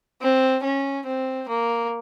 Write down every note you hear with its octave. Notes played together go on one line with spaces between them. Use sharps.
C4
C#4
C4
A#3